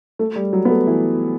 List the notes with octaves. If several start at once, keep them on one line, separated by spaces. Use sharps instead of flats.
A3
G3
F#3
B3
A3
E3